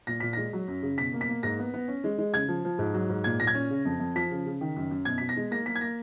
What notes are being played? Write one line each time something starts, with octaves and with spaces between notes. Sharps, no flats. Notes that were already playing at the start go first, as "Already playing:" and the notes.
A#2 A#6
A#2 B6
G#3 A#6
F#3
F#2
C#3
B2 B6
A#3
B6
A#3
G#2 A#6
B3
B3
C#4
G#3
G#3
C#3 G#6
F3
F3
G#2
F#3
G#2
A#2 G#6
A#2 A#6
G#6
C#4
C#3
F2
F2
F3 B6
C#3
C#3
D#3
F#2
F#2
B2 G#6
B2 B6
A#6
G#3
A#3 A#6
A#3 B6
G#6
A#3 A#6